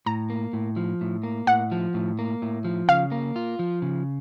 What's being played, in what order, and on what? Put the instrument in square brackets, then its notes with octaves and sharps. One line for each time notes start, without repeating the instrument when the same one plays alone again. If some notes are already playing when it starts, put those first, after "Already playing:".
[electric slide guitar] A2 [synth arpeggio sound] A#5
[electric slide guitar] A#3
A2
F3
A2
A#3
[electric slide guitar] A2 [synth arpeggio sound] F#5
[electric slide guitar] F3
A2
A#3
A2
F3
[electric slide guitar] C#3 [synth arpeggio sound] F5
[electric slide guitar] A#3
F4
F3
C#3